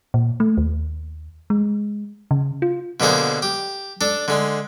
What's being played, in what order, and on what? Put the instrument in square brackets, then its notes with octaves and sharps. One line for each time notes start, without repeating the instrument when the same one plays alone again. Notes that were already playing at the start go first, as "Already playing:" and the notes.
[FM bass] A#2
A3
D#2
G#3
C#3
F4
[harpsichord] B2 D3 A#3 G#4 C5
G4
D4 A4
D3 G#3